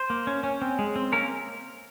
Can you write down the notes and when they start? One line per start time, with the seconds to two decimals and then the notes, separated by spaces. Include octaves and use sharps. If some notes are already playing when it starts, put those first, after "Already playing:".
Already playing: C5
0.10 A#3
0.27 C#4
0.44 C#4
0.62 C4
0.79 G#3
0.96 C4
1.12 A#3 C#4 A#4